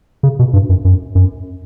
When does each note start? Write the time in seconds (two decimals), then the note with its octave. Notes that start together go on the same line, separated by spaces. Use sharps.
0.23 C#3
0.39 B2
0.54 G2
0.70 F#2
0.85 F#2
1.15 F#2